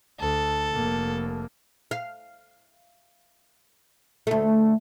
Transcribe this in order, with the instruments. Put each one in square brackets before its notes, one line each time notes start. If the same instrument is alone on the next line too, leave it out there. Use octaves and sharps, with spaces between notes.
[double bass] D2 [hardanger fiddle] A4
[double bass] F1 A#3
[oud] F5
D2 A3